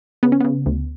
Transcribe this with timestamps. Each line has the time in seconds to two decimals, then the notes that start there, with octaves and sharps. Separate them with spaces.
0.23 C#3 B3
0.32 C#4
0.41 C#3 B3
0.66 D2